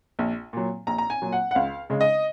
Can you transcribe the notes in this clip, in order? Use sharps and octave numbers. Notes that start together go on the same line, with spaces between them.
A#1
A#2 F#3
A#1 A#5
A#5
G#5
A#2 F#3
F#5
F#5
C#2 F5
C#3 G#3
D#5